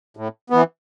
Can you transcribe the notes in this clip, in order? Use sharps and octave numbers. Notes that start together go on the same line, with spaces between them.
A2
E3 B3